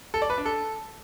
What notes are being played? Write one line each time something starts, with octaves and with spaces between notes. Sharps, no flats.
A4
D5
B4
D4
A4